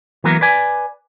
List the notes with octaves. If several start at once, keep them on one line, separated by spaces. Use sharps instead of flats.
E3 F#3 A#3 B3 A#4
B4 D5 G#5